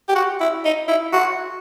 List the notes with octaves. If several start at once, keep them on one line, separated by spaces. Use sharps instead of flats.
G4
F#4
E4
D#4
E4
F#4